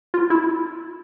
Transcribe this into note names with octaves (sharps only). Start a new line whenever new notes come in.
F4
E4